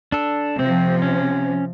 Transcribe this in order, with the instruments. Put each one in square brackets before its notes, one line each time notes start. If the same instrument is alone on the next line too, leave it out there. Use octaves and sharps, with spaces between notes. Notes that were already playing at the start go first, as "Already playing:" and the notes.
[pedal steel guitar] D4 A4
[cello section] C3 F3 [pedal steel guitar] C4
[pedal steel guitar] C#4